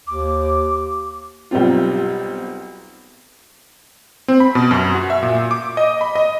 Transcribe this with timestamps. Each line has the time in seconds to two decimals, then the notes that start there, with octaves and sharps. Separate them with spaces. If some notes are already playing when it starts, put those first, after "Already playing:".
0.07 D#2 D6
1.51 B1 G3 C4 F4
4.28 C4
4.40 B5
4.55 B2
4.71 F#2
4.95 F#4
5.10 E5
5.23 A#2
5.51 D6
5.77 D#5
6.01 B5
6.16 D#5